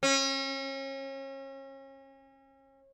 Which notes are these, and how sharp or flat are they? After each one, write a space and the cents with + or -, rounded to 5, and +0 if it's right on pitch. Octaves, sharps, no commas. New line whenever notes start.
C#4 -35